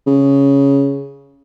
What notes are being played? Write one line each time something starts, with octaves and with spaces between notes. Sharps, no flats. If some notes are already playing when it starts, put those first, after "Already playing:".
C#3